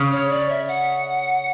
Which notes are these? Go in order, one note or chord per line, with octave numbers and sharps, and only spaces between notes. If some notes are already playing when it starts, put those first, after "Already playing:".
Already playing: C#3
C#5
D5
E5
F#5